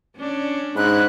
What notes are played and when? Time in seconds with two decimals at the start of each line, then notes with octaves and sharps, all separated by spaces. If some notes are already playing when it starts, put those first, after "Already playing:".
0.17 C#4 D4
0.76 G#2 G#5 B5 F#6